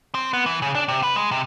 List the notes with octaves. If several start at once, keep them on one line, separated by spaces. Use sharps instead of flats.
C4
B3
E3
C#3
D4
C3
B4
G#3
C3